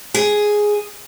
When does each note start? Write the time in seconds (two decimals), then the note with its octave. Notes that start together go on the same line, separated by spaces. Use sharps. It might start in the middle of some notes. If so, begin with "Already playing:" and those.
0.14 G#4